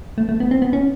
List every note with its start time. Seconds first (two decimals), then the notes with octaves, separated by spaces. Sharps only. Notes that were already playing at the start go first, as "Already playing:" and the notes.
0.18 A3
0.29 A3
0.40 B3
0.51 C4
0.62 B3
0.73 C#4